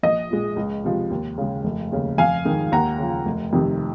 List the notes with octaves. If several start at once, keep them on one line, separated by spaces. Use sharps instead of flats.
A#1 D#5
A#2 G#3
C#2
C3 F3 G#3
D#2
C#3 G#3
F1
D#2 C#3
F2 F5 G#5
D#3 G#3
D#2 F#5 A#5
C#3 F3
F1
F2 C3 D#3